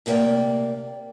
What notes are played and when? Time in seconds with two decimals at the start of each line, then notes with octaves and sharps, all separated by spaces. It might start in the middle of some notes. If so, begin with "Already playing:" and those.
0.06 D2 C3 A#3 A#4 D5 G5